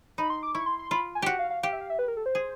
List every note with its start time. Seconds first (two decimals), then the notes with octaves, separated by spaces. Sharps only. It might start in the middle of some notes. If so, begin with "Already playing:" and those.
0.18 D#4 B5
0.30 C6
0.43 D6
0.55 E4 C#6
0.66 C6
0.79 C6
0.91 F4 B5
1.15 G#5
1.22 F#4 G4 F#5
1.39 F5
1.50 F5
1.63 G4 F5
1.73 E5
1.81 F5
1.90 E5
1.99 B4
2.08 A#4
2.17 A4
2.26 C5
2.35 G#4